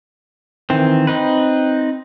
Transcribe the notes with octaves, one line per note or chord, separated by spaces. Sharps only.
D#3 E3 C4
C4 D#4 B4